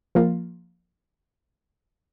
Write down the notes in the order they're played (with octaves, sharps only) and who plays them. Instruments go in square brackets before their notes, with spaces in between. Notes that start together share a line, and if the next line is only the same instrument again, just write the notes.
[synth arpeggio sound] F3 A#3 F4